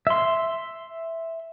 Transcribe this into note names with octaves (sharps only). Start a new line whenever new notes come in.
E5 C6